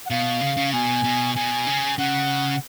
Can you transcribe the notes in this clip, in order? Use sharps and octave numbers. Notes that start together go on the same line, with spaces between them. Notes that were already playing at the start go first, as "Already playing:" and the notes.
F#5
B2 F5
C#3
C#3
B2 G#5
B2
B2 G#5
C#3
C#3 F#5